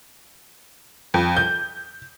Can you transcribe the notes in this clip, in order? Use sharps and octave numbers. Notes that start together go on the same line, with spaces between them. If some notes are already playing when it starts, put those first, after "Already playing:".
F2
G6